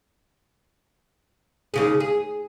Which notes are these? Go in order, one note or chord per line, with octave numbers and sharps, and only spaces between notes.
D#2 C#3 G#4
G#4